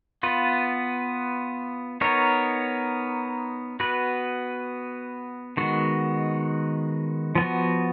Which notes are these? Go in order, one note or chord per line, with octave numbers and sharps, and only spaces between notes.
B3 F4 B4
B3 D#4 A#4 C#5
B3 F#4 B4
D#3 G#3 B3 F#4
F3 B3 F#4